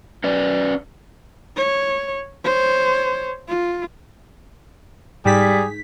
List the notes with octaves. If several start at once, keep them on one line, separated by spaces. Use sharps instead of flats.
C#4 B4 D5
C#5
C5 C#5
F4
G#2 G3 G#4 B6